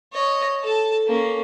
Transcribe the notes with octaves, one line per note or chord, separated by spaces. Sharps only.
C#5 D#5
A4 A5
A#3 C#4